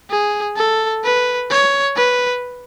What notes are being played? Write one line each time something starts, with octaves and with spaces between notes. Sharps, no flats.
G#4
A4
B4
C#5
B4